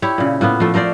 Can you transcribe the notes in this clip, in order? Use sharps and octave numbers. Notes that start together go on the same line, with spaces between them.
E4 G4 C#5
A#2 C#3
A2 A#3 B3
F3 A3
A3 A#4 C5 D5